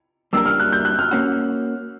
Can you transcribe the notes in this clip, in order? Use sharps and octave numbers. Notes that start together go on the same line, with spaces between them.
G3 A#3 D4 G4 A#4 E6
F6
F#6
G6
F#6
F6
A#3 C#4 F#4